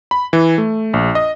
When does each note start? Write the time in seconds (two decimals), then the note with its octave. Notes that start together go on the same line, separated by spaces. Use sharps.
0.11 B5
0.33 E3
0.58 A3
0.94 A#1
1.15 D#5